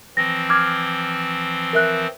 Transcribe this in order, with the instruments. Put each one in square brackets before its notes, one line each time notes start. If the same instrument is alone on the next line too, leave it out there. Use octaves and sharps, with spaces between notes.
[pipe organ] E3 F3 C4 [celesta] A#6
[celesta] D6 F6 G#6
A#4 E5 F#6